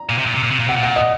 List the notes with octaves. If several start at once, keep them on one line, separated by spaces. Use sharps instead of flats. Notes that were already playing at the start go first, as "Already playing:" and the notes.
Already playing: A#5
A#2
C3
A#2
C3
A#2
C3
A#2
C3 F#5
A#2
F#5
D#5